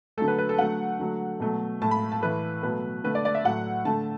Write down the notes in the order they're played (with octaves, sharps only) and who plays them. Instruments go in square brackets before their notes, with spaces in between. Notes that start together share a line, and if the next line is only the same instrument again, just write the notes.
[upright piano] D3 F#3 A3 A4
B4
B4
A4
D3 F#3 A3 F#5
D3 F#3 A3
B2 F#3 A3
A2 A3 A5
B5
A5
A2 E3 A3 B4
B2 F#3 A3 B4
D3 A3 B4
D5
D5
E5
A2 F#3 A3 F#5
D3 A3 A5